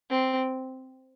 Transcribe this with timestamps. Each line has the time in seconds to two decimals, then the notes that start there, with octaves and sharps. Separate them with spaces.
0.10 C4